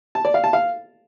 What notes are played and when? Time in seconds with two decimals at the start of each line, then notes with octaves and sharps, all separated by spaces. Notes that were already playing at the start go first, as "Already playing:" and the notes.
0.15 A5
0.25 D5
0.34 F5
0.44 A5
0.53 F5